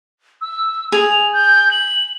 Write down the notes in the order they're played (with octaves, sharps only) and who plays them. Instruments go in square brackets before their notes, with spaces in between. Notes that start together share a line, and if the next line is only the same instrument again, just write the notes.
[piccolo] E6
[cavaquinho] G#4 [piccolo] F7
[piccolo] G6
F#7